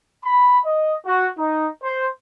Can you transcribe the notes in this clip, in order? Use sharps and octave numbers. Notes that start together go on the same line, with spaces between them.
B5
D#5
F#4
D#4
C5